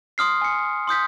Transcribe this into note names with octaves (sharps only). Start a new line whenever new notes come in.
C6 D#6 F6 C7
G#5 C#7
C6 D#6 G6 B6